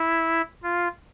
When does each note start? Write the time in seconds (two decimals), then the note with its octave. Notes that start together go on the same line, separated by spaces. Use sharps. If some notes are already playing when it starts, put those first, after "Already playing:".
Already playing: E4
0.63 F4